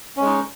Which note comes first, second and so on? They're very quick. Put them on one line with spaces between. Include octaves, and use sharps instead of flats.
C#4 G#3 D#4